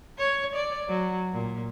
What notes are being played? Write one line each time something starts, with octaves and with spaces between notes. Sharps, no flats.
C#5
D5
F#3
A#2